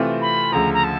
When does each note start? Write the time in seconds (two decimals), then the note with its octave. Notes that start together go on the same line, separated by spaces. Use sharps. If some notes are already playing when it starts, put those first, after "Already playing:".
Already playing: C3 E3 A3 C4 F4
0.21 B5
0.52 D2 C#3 F3 A#5
0.73 A#5
0.84 A5